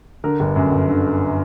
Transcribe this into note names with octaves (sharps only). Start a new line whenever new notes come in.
D3 A#4
G1
F#2
G1
D3